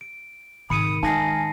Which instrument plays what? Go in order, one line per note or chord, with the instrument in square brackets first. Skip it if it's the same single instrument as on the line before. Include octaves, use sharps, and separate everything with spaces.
[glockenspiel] D7
[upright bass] G#2 C3 [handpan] D#3 [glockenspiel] B5 C#7 D#7 [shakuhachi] D#6
[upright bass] G#3 [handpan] D#4 F5 [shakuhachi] G#5 [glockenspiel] A5 A#6 C7